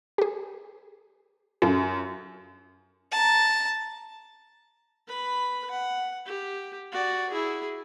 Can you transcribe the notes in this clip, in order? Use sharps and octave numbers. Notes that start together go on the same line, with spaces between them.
G4 G#4
F#2 F4 A4
A5 A#5
B4 B5
F#5
G4
F#4 D5
E4 G#4